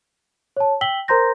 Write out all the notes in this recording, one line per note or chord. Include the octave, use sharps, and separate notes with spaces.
C#5 A5
G5 E6 B6 F#7 G7
A#4 C5 A#5 C6 G6 A#6